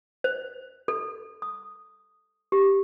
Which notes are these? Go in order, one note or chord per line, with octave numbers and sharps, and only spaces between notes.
C5
A4
D#6
G4